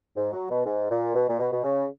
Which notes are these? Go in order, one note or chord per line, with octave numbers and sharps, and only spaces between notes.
G#2
F#3
B2
G#2
A#2
B2
A#2
B2
B2
C#3